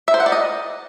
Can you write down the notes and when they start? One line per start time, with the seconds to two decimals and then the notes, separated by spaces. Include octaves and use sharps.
0.08 E5
0.14 C5
0.20 F#5
0.26 D5
0.32 D#5